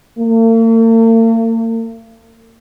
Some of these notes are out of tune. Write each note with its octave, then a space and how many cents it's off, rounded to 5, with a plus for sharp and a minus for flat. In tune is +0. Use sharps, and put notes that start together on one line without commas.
A#3 -45